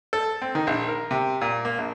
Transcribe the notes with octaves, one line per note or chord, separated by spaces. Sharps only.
A4
C4
D#3
A#1
A#4
C3
A#2
A#3
A#1